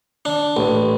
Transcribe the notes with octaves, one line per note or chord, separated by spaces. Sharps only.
D4
A1